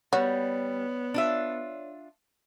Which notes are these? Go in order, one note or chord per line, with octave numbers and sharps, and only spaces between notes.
G3 B3 F#4 C#5
D4 F4 E5